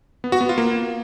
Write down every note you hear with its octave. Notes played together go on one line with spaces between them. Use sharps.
B3
F#4
B3
F4
A#3